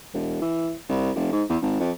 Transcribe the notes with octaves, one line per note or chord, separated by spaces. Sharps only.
E1
E3
C2
F1
G#2
E2
G#1
F2